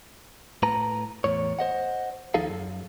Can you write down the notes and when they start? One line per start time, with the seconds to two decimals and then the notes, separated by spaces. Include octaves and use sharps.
0.63 A2 B4 A5 A#5
1.24 E2 A2 C#5
1.59 C5 D#5 F#5
2.34 D#2 F3 D#4 G#4 A4 F5
2.50 F#2